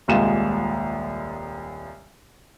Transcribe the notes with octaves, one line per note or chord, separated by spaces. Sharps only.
D#1 C2 G#3 F4 E7